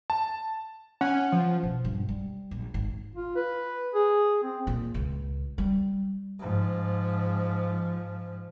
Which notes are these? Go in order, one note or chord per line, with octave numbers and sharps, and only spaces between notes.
A5
C#4 F#5
F3
B2
G2
G3
A#1
G#1
F4
B4
G#4
C4
A#2
C#2
G3
G#2 F3